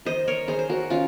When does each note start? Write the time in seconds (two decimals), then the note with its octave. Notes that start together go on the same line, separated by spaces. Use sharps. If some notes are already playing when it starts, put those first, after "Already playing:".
0.05 D#3 C5 D#5
0.28 A#4 C#5
0.48 D#3 G#4 C5
0.59 C5
0.70 F#4 A#4
0.90 D#3 C#4 F4